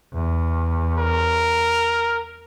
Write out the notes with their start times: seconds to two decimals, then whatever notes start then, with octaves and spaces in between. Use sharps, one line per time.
0.14 E2
0.98 A#4